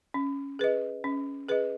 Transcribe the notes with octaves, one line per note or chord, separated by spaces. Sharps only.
C#4
G#4 B4 D#5
C#4
G#4 B4 D#5